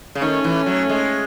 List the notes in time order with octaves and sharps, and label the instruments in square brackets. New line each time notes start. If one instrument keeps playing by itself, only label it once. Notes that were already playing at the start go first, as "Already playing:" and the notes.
[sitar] C#3
[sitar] D#3 [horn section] A3 C#4
[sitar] E3
F#3
G#3